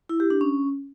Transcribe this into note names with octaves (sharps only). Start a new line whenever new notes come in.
E4
G4
D4
C#4